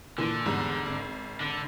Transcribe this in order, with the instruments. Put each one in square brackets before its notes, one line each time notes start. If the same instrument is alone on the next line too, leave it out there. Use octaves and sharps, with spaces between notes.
[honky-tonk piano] A#2 E3 [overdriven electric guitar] D3
[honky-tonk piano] E2 G#2 G3
G#1
[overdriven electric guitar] D3